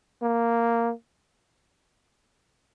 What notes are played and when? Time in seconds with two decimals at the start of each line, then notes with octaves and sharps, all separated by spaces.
0.22 A#3